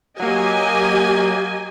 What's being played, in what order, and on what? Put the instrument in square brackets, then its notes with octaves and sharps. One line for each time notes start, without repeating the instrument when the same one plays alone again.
[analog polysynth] F#3 A#3 [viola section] G4 D#5 G#5